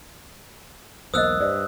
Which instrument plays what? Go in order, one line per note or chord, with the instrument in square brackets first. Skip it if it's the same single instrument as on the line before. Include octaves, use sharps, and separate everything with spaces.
[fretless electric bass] E1 B1 A#3 [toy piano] C5 D#5 [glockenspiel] D#6 E6 F#6
[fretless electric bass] G2 [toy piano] C5 D5